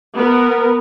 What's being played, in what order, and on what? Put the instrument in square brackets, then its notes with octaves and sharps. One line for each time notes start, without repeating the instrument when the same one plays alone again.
[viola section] B3 A#4